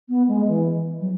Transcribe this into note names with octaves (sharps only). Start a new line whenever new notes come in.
B3
G#3
E3
F#3